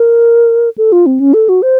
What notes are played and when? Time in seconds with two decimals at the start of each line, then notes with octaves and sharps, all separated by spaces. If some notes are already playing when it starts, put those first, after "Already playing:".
Already playing: A#4
0.78 A4
0.92 F4
1.06 C4
1.20 C#4
1.34 A4
1.49 F#4
1.62 C5